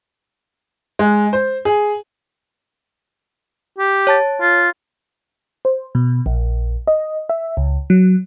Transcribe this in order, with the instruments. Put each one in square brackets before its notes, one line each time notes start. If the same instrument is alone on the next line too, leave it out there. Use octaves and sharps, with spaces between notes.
[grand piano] G#3
C5
G#4
[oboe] G4
[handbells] C#5 A5 A6
[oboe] F4
[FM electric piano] C5
B2
A#1
D#5
E5
C#2
F#3